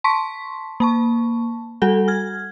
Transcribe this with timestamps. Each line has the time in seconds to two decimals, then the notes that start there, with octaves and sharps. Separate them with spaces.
0.04 A5 C6 C#6 B6
0.80 A#3 A5 C#6
1.82 G3 F#4 A4 F#5
2.08 F6 G#6